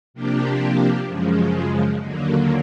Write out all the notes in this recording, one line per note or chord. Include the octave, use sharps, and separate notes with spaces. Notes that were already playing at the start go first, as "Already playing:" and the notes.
C3 F3 A#3 D4 G4
F#2 C#3 F3 G#3
D#2 D3 F#3 A#3